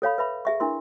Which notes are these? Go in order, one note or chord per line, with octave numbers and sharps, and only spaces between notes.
A4 C#5 F5 B5
B4 E5 B5
G#4 E5 C#6
D4 E4 A#4 C6